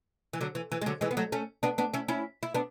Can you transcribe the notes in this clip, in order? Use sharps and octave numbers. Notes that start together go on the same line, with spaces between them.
E3
D3 F#3
E3
E3
G#3
D3 F#3
E3 G#3
B3
F#3 A3
A3 C#4
B3 D4
B3 D4
C#4 E4
C#4 E4
E4
B3 D4